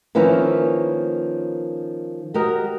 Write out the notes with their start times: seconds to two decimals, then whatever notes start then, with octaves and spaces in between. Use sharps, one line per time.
0.15 D#3 F3 A#3 C#4 E4 B4
2.34 F#4 G4 A#4 D#5